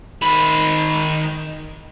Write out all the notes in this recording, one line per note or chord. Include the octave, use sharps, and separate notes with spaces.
D#3 B5